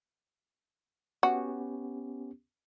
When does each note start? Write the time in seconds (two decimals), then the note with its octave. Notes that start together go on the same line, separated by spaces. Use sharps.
1.23 B3 C#4 F#4 G4